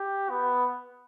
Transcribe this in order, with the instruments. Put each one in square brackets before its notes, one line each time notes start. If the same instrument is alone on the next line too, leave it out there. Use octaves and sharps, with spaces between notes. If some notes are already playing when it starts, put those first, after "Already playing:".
Already playing: [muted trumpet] G4
B3